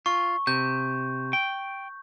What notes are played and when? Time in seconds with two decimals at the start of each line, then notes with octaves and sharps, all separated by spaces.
0.06 F4 C#6
0.47 C3 G6
1.33 G5